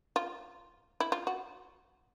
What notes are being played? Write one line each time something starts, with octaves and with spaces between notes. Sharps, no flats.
F4
E4
F4
F#4